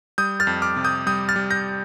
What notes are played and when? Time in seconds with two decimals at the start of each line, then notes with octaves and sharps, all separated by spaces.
0.18 G3 D#6 G6
0.40 F6 A6
0.47 F2
0.62 D6 F6
0.76 C3
0.84 D#6 G6
1.06 G3 D#6 G6
1.29 F6 A6
1.36 G3
1.50 G6 A#6